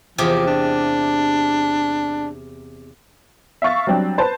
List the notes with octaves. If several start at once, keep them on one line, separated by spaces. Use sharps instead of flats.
E2 C3 F3 G4
D4
E5 F5 C#6 A6
F#3 G3 C4 D4
B4 C5 A5